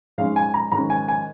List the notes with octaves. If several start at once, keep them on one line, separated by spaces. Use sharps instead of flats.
G#2 G#3 C#4 F5
G#5
A#5
G#2 D#3 C#4 A#5
G#5
G#5